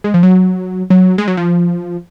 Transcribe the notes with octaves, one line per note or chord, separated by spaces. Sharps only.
G#3
F3
F#3
F#3
G#3
F#3
F3